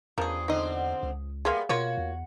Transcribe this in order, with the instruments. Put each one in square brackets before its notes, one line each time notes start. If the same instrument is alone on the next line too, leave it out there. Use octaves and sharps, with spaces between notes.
[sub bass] E2 [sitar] G2 [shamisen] C#3 A#4 [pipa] F3 G#4
[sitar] D3 C4 [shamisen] D#4 D#5
[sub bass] C#2
[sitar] G3 B3 [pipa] A#3 C6 [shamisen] G#4 E5 F5
[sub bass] B2 [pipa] A#3 F4 C#5 [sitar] F#4
[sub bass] E2